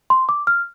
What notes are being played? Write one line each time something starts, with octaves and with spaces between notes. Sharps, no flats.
C6
D6
F6